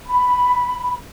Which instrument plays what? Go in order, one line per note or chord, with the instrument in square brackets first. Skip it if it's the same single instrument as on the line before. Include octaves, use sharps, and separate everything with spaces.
[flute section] B5